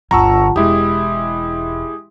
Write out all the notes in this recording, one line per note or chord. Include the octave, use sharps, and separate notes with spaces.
G1 D2 F4 F#5 A5 A#5 C#6 E6
E1 G#3 E4 G4 D#6